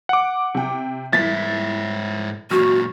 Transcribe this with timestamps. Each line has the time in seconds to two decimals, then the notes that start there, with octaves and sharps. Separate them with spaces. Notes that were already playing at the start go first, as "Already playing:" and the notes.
0.09 F#5 D6
0.55 C3 G5
1.13 C2 G#2 E3 E5 A6 B6
2.51 F#2 A#2 F#4 C#6 F6